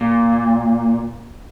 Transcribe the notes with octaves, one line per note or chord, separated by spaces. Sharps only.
A#2